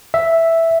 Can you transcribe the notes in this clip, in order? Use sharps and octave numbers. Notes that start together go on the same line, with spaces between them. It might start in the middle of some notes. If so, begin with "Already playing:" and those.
E5